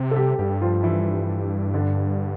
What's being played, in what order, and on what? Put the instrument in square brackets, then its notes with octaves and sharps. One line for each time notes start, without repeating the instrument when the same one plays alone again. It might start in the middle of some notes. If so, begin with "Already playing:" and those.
Already playing: [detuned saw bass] C3
[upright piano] A4
G3 G4
[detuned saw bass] G2 [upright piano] G3 G4
[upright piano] F3 F4
E3 E4
D3 D4